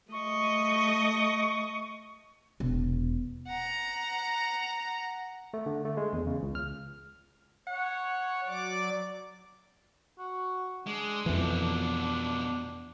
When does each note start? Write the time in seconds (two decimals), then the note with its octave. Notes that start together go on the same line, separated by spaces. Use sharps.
0.12 A3 D#5 C#6
2.60 E1
3.47 F#5 A#5
5.54 A3
5.66 D3
5.85 A3
5.97 G#3
6.13 E2
6.27 C#3
6.42 C#2
6.55 F6
7.67 C#5 F#5
8.47 F#3 D5 D6
10.19 F#4
10.87 G#3 D4
11.26 F2 B2 E3 F3